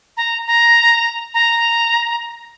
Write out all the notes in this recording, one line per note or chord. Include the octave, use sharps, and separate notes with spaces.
A#5
A#5
A#5